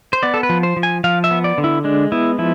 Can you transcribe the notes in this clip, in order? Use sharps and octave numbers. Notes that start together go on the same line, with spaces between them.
C5
B3 D5
A4
B4
F3
C5
F3
G#5
F3 F5
E5
B3
D5
D3
E4
G#3 D4
B3 E4
F3 E4